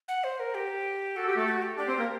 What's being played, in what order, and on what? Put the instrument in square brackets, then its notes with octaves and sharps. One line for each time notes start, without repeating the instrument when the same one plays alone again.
[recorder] F#5
C5
A#4
G4
[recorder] F#4 [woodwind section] A4
[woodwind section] G4
A3 A4
[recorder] F#4
G4
[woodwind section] D4 D5 [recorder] G4
[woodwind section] C4 C5
A#3 A#4